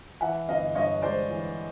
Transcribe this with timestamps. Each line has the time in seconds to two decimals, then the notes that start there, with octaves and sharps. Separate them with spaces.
0.21 E3 E5 F#5
0.48 G1 D#5 F5
0.75 G2 C#5 D#5
1.02 G#3 C5 D5
1.29 E3